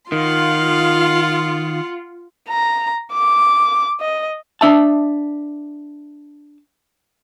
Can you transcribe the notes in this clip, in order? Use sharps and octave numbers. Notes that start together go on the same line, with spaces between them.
D#3 F4 F5 F#5 C6
A#5
D6
D#5
D4 E5 A5